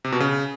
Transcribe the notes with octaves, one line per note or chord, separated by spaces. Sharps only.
C3
B2
C#3